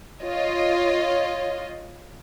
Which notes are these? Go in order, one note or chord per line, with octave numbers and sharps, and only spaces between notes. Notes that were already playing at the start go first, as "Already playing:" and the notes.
F4 C#5 D#5